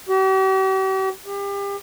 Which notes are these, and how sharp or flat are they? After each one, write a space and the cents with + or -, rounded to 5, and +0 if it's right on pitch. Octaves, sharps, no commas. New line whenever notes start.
G4 -45
G4 +30